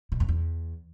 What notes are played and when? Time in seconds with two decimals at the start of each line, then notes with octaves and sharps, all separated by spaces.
0.12 B2
0.20 F2
0.28 E2